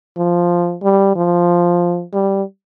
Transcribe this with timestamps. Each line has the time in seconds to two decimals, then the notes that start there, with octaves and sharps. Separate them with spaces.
0.17 F3
0.83 G3
1.16 F3
2.13 G3